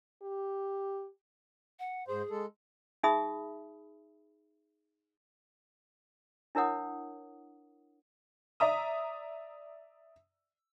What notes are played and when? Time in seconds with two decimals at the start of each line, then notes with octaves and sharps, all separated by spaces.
0.22 G4
1.79 F#5
2.08 G#2 G#4 C5
2.30 G#3 A4
3.03 D#4 G#4 E5 B5 D#6
6.55 D4 E4 A#4 C#5 F#5 D#6
8.60 D5 E5 A#5 D#6